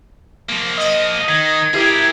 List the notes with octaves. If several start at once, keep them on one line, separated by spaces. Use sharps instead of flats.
F3 A#3
D#5
D#3 G#6
E4 G4 G#4 A#4